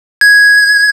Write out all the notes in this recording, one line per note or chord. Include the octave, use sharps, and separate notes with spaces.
G#6